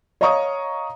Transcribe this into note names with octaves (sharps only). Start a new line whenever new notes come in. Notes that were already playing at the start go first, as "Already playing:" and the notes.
C#5 D#5 F5 A#5 C#6 D#6